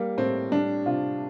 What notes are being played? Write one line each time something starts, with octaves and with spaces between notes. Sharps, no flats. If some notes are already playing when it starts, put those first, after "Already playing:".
Already playing: G3 A#3
A2 C4
G3 D4
C3 F4